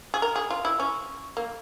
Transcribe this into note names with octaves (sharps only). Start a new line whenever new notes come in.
G#4
A#4
G#4
F4
E4
C#4
A#3